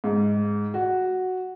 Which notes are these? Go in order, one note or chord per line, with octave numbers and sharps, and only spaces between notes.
G#2
F#4